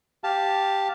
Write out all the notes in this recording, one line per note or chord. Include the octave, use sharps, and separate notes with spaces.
G4 F5 A5